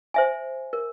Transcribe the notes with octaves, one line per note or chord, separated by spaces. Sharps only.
C5 E5 G#5
A#4